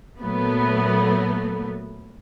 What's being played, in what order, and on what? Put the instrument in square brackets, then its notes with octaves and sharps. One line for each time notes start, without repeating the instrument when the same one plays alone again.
[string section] A#2 F#3 A3 B3